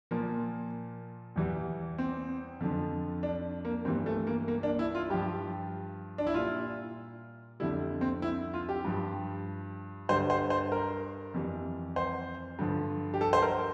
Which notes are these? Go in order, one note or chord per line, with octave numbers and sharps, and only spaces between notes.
A#2 F3 A#3
E2 E3 G3
C4
F2 D3 F3
D4
A#3
G2 E3 G3 C4
A3
A#3
A#3
D4
E4
F4
G2 F3 G4
D4
E4
A#2 G3 F4
F2 D3 G3 E4
C4
E4
F4
G4
G2 F3
G2 D3 G3 C5
C5
C5
A#4
F2 E3 G3
C5
G2 D3 F3
G4
A4
C5
A#4